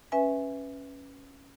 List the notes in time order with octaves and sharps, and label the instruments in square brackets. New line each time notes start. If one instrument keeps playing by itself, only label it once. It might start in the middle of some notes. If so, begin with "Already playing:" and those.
[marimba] C#4 B4 E5 G#5